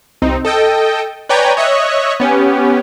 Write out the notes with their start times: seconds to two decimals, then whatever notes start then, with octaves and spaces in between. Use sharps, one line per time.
0.22 C2 C4 D#4
0.45 A4 D#5 G5
1.29 B4 C#5 D5 G5 G#5 A#5
1.57 C#5 D#5 E5 C#6 D#6 F#6
2.20 B3 C#4 G4